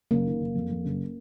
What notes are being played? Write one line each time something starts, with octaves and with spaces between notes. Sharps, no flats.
F#1 A#3
D#3
F#1
F2
F2
F#1